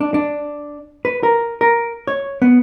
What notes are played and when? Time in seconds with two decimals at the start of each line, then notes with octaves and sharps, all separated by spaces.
0.01 D4
0.14 D4
1.05 B4
1.23 A#4
1.61 A#4
2.07 C#5
2.42 B3